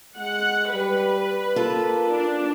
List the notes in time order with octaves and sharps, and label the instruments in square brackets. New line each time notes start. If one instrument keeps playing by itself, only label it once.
[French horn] G#3 [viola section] F#5
[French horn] G3 [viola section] B4
[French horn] A#3 [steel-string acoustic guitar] F4 A4
[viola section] D4